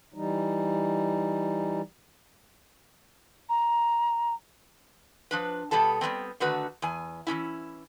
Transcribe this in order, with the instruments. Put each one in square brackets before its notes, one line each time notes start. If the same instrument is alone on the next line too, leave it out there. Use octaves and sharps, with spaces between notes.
[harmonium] E3 G3 D#4
[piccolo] A#5
[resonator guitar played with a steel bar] F3 D4 B4
B2 G3 B3 A4 A5
G3 G#3 B3 C4
D3 D#3 A3 F#4 B4
E2 G#5
E3 F3 C#4 E4